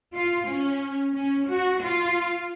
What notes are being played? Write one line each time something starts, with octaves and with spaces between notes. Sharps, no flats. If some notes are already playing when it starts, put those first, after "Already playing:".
F4
C#4
C#4
F#4
F4